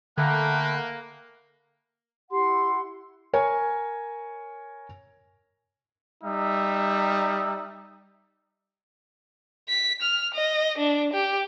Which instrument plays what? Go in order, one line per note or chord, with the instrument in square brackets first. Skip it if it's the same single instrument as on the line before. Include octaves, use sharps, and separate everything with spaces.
[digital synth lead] D3 [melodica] A3 G5 B5 [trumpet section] A#3 [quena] F#6
[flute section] E4 F#5 C6 [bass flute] G4
[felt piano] A#4 C#5 G#5
[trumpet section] G3 D#4 E5
[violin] B6
F6
D#5
D4
G4